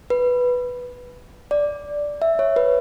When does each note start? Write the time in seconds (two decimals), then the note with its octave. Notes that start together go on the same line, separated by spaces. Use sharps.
0.10 B4
1.51 D5
2.22 E5
2.39 C#5
2.56 B4